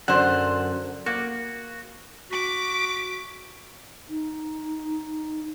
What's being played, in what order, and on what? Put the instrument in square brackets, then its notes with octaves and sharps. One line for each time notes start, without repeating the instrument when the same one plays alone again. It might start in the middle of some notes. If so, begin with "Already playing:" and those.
[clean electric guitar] F#2 F#5 [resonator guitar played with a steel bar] D3 C5
[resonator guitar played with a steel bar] A#3 [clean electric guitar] F#4
[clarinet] F#4 [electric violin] D6 B6
[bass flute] D#4